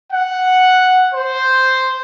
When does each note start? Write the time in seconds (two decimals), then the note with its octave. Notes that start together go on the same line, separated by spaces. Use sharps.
0.12 F#5
1.15 C5